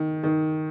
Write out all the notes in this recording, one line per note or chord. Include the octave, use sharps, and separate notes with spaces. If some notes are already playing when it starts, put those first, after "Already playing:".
Already playing: D#3
D#3